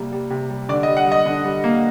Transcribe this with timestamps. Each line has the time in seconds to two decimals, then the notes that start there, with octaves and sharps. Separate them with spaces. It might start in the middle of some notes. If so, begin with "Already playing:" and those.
Already playing: C3 G3 A#3
0.12 G3
0.30 C3
0.50 G3
0.69 D3 D5
0.83 D#5
0.87 G3
0.97 F#5
1.06 G3
1.12 D#5
1.26 D3
1.45 G3
1.64 A#3